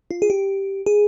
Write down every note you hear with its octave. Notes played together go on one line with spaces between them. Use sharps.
F4
G#4
G4
G#4